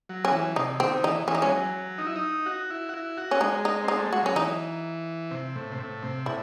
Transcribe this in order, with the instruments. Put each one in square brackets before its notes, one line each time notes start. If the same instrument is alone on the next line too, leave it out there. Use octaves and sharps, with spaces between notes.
[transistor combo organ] F#3
[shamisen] C#4
[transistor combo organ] E3
[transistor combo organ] C3 [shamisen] D#4
[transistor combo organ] D#3 [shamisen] C4
[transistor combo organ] E3 [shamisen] D#4
[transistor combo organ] E3 [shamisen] C#4
[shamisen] D#4
[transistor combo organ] G#3 [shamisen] C#4
[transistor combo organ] F#3
D#4
E4
D#4
F#4
E4
F#4
E4
F#4
[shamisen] C#4
[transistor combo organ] G#3 [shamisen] D#4
[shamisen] D#4
[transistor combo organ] C4 [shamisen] D#4
[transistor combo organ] A3
[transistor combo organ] G#3 [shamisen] F#4
[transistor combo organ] F#3 [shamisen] C#4
[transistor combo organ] E3 [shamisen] D#4
[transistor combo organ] C3
A2
C3
A2
C3
[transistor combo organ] A2 [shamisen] E4